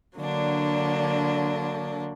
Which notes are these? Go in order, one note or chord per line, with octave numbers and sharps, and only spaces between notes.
D3 F#3 A#3 D4